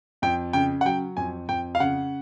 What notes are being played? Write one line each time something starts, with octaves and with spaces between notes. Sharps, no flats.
F2 G5
C#3 G5
F#5
F#3 G5
F2 G#5
F2 G5
F5
C#3 F#5